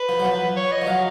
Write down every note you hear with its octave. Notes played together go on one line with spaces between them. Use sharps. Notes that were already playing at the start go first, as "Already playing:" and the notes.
Already playing: B4
F3
F#3
F3
C#5
D#5
F3
F#3 F5